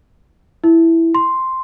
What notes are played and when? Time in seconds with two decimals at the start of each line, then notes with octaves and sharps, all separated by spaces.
0.64 E4
1.15 C6